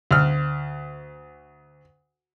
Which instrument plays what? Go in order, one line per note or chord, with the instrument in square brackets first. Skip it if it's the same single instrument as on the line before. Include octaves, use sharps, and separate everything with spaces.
[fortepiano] D2 F6